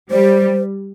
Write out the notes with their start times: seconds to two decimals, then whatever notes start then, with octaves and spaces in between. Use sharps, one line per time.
0.11 G3 C5